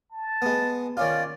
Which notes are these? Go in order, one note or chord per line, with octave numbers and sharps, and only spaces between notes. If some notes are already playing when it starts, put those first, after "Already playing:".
A5
G#3 B3
D#3 C#4 F4 D5